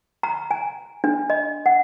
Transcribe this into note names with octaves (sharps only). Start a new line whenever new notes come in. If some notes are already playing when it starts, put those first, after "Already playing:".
A#5
G#5
D4
D#5
F#5